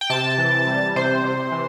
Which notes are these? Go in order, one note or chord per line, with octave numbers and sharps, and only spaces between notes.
G5
C3 A5
E3
G3
C3 C5
C3
E3